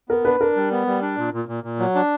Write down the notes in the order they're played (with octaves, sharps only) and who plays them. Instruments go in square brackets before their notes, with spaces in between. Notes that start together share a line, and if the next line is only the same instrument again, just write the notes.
[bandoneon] B3 [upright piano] A#4
[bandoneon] D4 [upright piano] B4
[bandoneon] D4 [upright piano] A#4
[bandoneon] G3
B3
G3
D4
A#2
A#2
A#2
A#2
F#3
D4